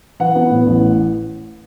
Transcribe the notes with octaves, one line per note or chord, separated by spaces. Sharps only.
E3 F#5
B3
A2
A1